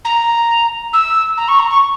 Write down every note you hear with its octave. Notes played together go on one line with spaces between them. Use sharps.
A#5
E6
A#5
C#6
A#5
C#6